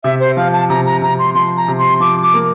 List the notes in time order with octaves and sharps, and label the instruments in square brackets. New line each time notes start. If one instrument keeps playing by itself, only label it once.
[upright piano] C3 [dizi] E5
[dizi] C5
[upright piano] F3 [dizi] F5
[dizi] A5
[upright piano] C3 [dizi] A#5
[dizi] A#5
[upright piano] C3 [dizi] A#5
[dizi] C6
[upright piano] F3 [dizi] C6
[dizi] A#5
[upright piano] C3
[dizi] C6
[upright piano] F3 [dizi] D6
[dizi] D6
[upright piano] A#3